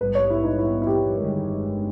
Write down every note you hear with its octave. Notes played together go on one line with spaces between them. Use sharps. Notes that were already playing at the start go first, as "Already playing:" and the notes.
A#1 G#2 G3 B3 B4
C#5
E4
D#4
E4
E4
G4
G1 G2 D#3 G#3